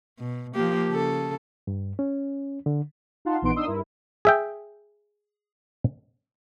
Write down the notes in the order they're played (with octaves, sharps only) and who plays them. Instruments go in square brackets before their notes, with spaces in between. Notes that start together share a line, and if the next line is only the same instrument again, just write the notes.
[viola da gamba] B2
F3 A#3 G4
C#3 A4
[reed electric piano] G2
C#4
D3
[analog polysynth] D#4 F4 F5 F#5 A5 C6
A#1 E3 B3 D#4 C6 D7
B3 D4 D#4 C6 D#6 E6
G2 E4 A#4
[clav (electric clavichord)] G#4 E5 G5